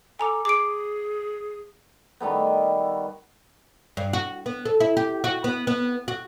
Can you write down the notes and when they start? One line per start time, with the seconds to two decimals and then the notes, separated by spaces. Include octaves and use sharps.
0.19 A4 G#5 A#5 D6
0.45 G#4 D6 D7
2.20 D#3 G3 A3 B3
3.97 G2
4.13 F#4
4.46 B3
4.65 A4
4.80 E4
4.97 G4
5.24 F#4
5.44 B3
5.67 B3
6.08 F#4